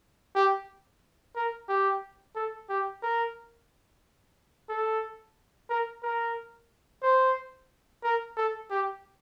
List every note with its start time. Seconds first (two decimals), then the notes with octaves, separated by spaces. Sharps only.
0.35 G4
1.36 A#4
1.69 G4
2.35 A4
2.69 G4
3.03 A#4
4.69 A4
5.69 A#4
6.03 A#4
7.03 C5
8.03 A#4
8.37 A4
8.71 G4